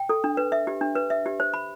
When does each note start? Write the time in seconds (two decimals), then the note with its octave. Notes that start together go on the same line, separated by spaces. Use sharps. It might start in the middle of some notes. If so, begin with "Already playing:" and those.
Already playing: G5
0.09 A4
0.24 D4
0.37 B4
0.52 E5
0.67 G4
0.81 D4
0.95 B4
1.10 E5
1.26 G4
1.40 C5
1.54 B5